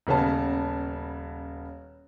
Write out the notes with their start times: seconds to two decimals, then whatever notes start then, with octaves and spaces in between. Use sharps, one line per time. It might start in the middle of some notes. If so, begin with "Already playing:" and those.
0.07 D#1 C#3 B3 C#4 A5